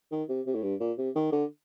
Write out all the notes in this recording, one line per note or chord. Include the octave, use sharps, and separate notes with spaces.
D#3
C3
C3
A2
G2
A#2
C3
D#3
D3